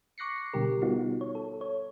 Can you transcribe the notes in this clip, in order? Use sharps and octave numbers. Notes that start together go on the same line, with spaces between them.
C#6 D6 F#6 A#6 C7 C#7
B2 D3 G3 G4 A#4
G3 B3 D#4 F4 F#4
C#5
A4
C#5